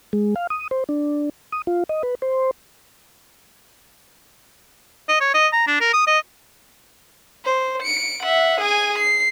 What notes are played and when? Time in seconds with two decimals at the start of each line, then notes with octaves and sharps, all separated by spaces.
0.13 G#3
0.36 F5
0.50 D#6
0.71 C5
0.89 D4
1.52 D#6
1.67 F4
1.89 D#5
2.03 B4
2.22 C5
5.09 D#5
5.20 C#5
5.34 D#5
5.53 A#5
5.67 D4
5.81 A#4
5.93 D#6
6.07 D#5
7.45 C5
7.83 C#7 D7
8.23 E5 F#5
8.60 G#4 G#5
8.99 C7